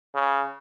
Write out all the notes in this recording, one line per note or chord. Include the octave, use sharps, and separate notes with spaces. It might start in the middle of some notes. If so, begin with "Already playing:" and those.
C#3